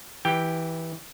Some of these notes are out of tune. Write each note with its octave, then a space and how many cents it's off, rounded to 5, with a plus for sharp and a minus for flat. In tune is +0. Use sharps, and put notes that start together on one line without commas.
E3 -10 G4 +0 G5 +0